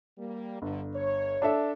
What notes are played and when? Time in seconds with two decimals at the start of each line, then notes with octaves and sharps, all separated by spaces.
0.18 G3 A#3
0.62 G1 G2 D3
0.94 C#5
1.42 D4 A4 E5